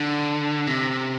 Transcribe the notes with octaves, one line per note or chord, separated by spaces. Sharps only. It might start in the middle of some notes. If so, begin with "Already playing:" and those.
Already playing: D3
C3